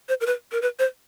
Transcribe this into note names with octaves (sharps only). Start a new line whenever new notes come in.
C5
A#4
B4
A#4
B4
C5